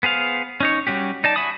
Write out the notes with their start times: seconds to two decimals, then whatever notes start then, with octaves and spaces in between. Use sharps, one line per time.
0.03 B3 G#4 C5 F5
0.60 C#4 D#4 C#5
0.87 G3 C#4 F#4 G4
1.24 D#4 D5 A5
1.36 F#4 E5 G#5 B5 D#6